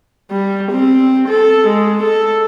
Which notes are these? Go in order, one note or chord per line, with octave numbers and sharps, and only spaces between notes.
G3
C4
A4
G#3
A4